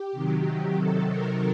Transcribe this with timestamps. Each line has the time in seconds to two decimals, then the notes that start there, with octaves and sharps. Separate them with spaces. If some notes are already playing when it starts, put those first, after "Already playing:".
Already playing: G4
0.12 C3 D#3 F#3
0.77 C3 D#3 F#3 A4
1.09 A#4